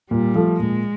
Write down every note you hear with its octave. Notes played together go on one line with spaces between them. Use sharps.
A#2 G3
F3 A3
A#2 G#3